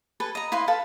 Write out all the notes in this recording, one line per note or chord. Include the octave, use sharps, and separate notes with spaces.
A4 B4 G#5
D#5 A#5
E4 B4 F5 C6
A4 B4 F5 A5